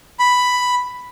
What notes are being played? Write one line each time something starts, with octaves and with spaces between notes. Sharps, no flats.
B5